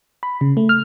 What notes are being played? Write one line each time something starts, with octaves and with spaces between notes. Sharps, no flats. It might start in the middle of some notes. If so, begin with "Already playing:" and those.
B5
C#3
A3
F6